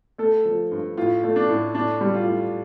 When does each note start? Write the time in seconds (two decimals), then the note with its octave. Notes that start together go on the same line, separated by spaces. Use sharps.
0.18 A3 A4
0.45 F3
0.71 G2
0.97 A2 F4
1.23 A3
1.36 D4
1.49 A2
1.75 A2 D4
2.01 G3
2.14 F4
2.27 A2